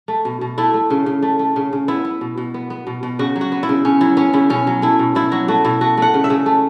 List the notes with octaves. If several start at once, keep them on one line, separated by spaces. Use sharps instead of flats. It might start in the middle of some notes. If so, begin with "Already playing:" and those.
A3
B2
B2
A3 E4
A3
C#3
C#3
A3
A3
C#3
C#3
B3 E4
B3
B2
B2
B3
B3
B2
B2
C#3 F#4
F#3
F#4
B3
E4
C#3
C#3 C#4
F#3 E4
B3 C#4
C#3 E4
B2 C#4
F#3
A3 E4
B2
B2 E4
F#3 F#4
A3 F#4
B2 E4
A3 F#4
A3 F#5
C#3
E5
C#3
A3